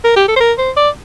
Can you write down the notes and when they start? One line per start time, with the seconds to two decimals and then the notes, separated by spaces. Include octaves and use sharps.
0.04 A#4
0.16 G4
0.28 A4
0.36 C5
0.40 A#4
0.58 C5
0.77 D5